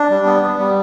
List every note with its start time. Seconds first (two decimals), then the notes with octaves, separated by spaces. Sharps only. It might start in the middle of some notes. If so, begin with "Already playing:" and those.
Already playing: D4
0.10 G3
0.26 B3
0.42 B3
0.59 G3